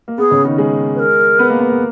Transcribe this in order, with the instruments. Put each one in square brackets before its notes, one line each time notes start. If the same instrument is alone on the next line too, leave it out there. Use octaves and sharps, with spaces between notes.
[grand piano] A#3
[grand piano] B3 [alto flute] G#4
[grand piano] C#3 C#4
D#3 D#4
G#3 G#4
[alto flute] B4
A#4
[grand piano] B3 B4
A#3 A#4
B3 B4
A#3 A#4